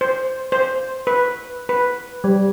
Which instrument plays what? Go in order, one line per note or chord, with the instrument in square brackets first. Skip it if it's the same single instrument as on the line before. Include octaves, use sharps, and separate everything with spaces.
[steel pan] C5
C5
B4
B4
G3